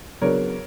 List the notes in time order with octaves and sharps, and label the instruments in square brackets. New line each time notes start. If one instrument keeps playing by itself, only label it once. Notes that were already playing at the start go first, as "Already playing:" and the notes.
[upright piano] C#3 F#3 B3 D4 A#4 C#5